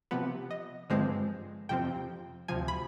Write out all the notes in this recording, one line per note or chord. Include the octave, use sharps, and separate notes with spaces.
C3 F3 B3
D#5
G2 D3 F3 G#3 C4
F2 C3 F3 C4 G5
D2 C3 F3 G#5
B5